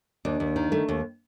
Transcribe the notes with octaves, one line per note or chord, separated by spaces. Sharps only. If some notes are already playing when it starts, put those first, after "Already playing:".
D#2 D4
D#2
D#3
A3
D#2